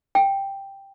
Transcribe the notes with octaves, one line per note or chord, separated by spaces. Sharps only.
G5